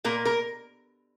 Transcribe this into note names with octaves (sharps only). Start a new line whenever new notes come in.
A#2 A#3 A#4
A#4